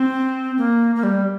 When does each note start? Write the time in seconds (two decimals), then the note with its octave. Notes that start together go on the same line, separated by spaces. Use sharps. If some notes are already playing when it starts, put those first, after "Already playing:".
Already playing: C4
0.58 A#3
0.96 A#3
1.03 G3